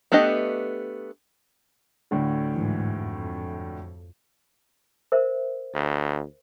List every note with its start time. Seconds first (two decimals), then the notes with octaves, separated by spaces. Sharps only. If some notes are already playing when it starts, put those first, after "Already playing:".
0.12 A3 B3 D4 G4 D#5
2.11 D2 A2 D3
2.54 G#2 E3
2.95 F2
5.12 A#4 C5 E5
5.74 D2